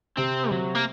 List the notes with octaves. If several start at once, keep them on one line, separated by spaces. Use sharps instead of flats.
C3 C4
C3 F#3
A#3